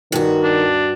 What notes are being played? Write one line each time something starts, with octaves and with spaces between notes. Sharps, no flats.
G2 D#3 F#4
D4